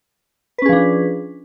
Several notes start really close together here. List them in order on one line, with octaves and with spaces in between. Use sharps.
B4 C#4 G#4 F3 D4